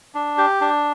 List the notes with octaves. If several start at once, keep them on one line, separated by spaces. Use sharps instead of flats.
D4
G4
D4